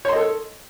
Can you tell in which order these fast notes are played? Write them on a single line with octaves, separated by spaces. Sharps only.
C#5 C6 D#5 A4